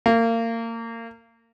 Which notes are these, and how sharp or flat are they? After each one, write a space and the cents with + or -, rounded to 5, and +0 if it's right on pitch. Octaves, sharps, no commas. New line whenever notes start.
A#3 -30